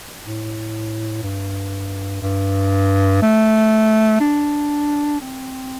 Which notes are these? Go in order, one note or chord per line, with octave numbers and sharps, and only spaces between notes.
A2
G2
G2
A3
D4
C4